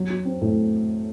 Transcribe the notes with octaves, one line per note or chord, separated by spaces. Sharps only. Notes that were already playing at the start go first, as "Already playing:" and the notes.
Already playing: F#3
F#4
C4
A2